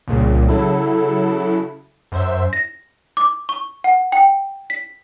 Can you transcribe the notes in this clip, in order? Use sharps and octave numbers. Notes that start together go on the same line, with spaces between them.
C2 A#2 C#3
C#3 F#3 E4 A4
F#2 C5 E5
A#6
D6
C#6
F#5
G5
B6